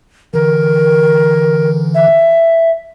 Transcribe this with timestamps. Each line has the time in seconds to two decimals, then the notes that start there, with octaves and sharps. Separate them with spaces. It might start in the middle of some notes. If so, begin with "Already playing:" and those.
0.34 D3 E3 A#4
1.95 E5